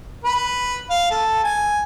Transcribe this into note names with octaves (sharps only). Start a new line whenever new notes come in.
B4
F5
A4
G#5